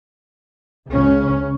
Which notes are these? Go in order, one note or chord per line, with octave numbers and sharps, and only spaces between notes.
C#2 C#3 C#4